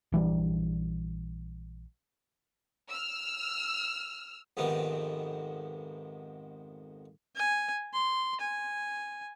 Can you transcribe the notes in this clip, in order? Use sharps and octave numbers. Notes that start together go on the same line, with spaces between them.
A#1 E3 G3 D4
E6 F6
F2 G#2 C3 D#3 B3
G#5
C6
G#5